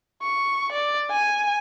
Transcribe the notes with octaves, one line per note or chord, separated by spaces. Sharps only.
C#6
D5
G#5